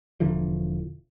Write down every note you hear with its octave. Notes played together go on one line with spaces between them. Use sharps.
E1 D3 E3 F3